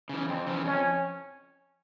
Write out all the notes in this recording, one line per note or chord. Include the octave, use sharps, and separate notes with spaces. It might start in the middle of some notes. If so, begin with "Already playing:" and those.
C#3 E3
F2 C4
C#3 E3
F2 C#4